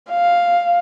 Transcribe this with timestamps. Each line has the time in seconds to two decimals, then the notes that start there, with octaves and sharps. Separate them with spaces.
0.10 F5